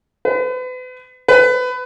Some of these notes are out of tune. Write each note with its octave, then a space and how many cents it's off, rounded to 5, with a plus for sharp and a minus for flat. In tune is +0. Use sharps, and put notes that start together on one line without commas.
B4 +40
B4 +25